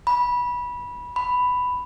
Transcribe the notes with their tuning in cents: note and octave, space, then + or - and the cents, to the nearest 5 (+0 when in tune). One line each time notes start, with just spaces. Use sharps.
B5 -20
B5 +5